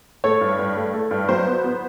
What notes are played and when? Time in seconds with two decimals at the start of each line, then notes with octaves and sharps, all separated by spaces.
0.24 A3 C#5
0.41 G2
0.59 G2
0.76 A3
0.94 A3
1.11 G2
1.29 F#3 C5
1.46 B3
1.64 B3